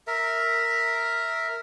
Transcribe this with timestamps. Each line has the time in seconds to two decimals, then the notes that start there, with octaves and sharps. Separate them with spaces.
0.07 A#4 E5